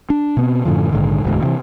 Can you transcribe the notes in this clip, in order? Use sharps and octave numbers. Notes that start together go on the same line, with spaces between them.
D4
B2 B3 C4
F#2 A2 D3 F3
A#1 G#2 D3 D#3
E1 D2 G#2 B2
C3 E3